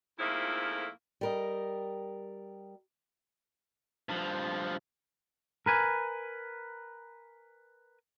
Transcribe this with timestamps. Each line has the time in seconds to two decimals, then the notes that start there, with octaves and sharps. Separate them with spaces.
0.19 F2 G#2 F3 A3 A#3 E4
1.21 G3 A#4 D#5
4.09 G2 F3
5.66 A#4 B4 G#5